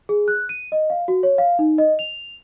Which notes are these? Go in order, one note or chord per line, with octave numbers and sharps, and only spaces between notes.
G#4
F#6
D#7
D#5
F5
F#4
C#5
F5
D#4
D#5
F7